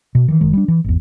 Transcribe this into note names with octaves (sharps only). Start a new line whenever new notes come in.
B2
D#3 E3
F#1 D#3 G#3
G3 D4
E3
G#1 E2